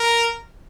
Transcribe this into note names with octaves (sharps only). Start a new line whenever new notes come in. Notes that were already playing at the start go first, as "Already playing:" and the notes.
Already playing: A#4